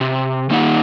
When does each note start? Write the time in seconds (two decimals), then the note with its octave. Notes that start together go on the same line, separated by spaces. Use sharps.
0.01 C3
0.50 D#3 A#3 D#4 G4 F#5